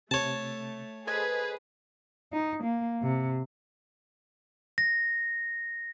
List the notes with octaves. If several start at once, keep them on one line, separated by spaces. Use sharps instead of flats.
C3 A3 C#5 A5
G#4 A4 B4 C5 D#5 G#6
D#4
A#3
C3
A#6